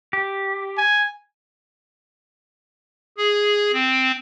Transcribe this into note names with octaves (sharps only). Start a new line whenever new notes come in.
G4
G#5
G#4
C4